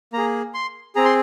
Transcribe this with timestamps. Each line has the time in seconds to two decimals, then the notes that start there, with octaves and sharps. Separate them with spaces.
0.13 A#3 G#4 A#5
0.54 C6
0.95 C4 G#4 A#5
1.05 C6